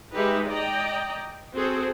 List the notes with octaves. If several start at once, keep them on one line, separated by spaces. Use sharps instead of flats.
G#3 D#4 G4 B4 E5
D5 D#5 G5 A#5
C4 F#4 G#4 A4 C5